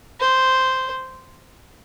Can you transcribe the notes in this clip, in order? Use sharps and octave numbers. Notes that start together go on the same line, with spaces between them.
C5